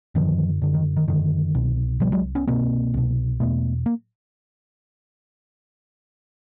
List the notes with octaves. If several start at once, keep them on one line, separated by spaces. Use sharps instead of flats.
F#2 D3 D#3 F3
F#2 D3
D#3
D#3
F#2 D3 D#3
C2 B2
C2 B2 F3 G3
F#3 G#3
B3 C#4
C2 B2 A#3 C4
C2 B2
E2 B2 A3 B3
A#3